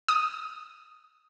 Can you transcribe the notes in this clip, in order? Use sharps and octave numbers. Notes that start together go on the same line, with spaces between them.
D#6